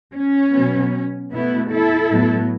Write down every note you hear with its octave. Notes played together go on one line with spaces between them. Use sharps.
C#4
B2 F#3 B3
B2 A3 B3 E4
E4 A4
A2 F#3 B3